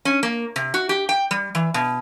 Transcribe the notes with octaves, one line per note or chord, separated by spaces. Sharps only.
C#4
A#3
C3
F#4
G4
G5
G3
E3
B2